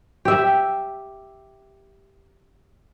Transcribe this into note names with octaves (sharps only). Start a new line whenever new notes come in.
G4 E5